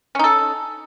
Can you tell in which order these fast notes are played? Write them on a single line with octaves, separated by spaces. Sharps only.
C#4 D#4 A4